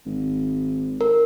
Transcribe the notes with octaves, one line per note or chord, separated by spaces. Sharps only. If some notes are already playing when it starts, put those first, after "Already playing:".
G#1
A#4